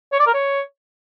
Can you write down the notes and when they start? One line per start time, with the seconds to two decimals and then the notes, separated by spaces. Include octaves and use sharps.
0.12 C#5
0.19 D5
0.27 A#4
0.34 C#5